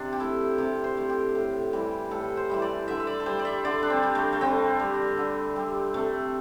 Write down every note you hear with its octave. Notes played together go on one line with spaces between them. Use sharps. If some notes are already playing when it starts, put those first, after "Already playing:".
Already playing: C3 D4
G4
A3 E4
C3 G4
C5
A3
G4
A2
E3 G3
A2 A4
C5
E3 G3 E5
D5
D3 E5
E5
D5
A4
G3 C5
D5
E5
D3 D5
D4
C4
G3
A3
A3
D3 C4
G3
D3
G3
C3 A3